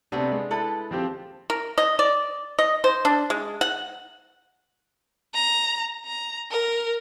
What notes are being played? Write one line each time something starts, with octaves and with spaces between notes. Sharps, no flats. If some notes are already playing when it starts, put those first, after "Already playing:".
C3 A3 B3 D4
G#3
E4 A4 B4
F3 C4 G4
A#4
D#5
D5
D#5
C5
D4
G#3
F#5
A#5
A#5
A#4